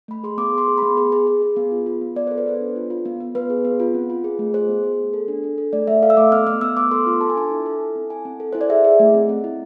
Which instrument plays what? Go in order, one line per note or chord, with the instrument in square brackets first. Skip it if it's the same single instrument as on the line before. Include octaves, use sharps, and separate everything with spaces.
[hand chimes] A3 B5
G#4 C6
B3 D6
G#4
C6
G#4
B5
B3
G#4
G#4
G#4
G#4
B3
F4
F4
B3
B3 D5
A4 C5
B4
B3 C5
D4
F4
F4
B3
B3
B3 B4
G#4
B3
F4
C4
F4
G#4
A3
G#4 C5
B3
G#4
B3
A4
D4
A4
A4
A3 D5
A3 E5
A4 F5
E6
A3 D6
B3 F6
B3 F6
B3 E6
B3 D6
A4 C6
F4
A4 A5
G#5
D4 A5
E4
A4
E4
C4
E4 G#5
C4
A4
E4 C5
D5
G#4 E5
G#4
A3
C4
C4
E4